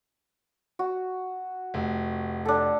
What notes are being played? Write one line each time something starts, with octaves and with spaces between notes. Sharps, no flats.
F#4
F1
D4 A4